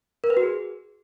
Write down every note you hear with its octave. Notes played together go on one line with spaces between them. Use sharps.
A#4
B4
F#4
G#4